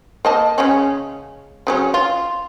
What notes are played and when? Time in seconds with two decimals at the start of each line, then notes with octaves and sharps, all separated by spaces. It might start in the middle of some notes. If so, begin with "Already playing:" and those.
0.25 A#3 D#5 A5
0.58 C#3 G#3 C#4
1.67 C#3 F#3 C#4
1.94 F4